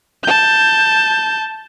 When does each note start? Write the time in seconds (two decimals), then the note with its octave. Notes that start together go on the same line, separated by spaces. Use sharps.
0.24 A5 G6